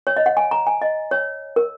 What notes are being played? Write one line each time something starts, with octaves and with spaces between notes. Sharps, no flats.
C#5
D#5
F#5
G#5
A#5
G#5
D#5
C#5
A#4